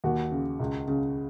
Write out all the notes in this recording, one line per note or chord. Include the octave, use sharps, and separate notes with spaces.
D#2 F#4
C#3
C#2
C#3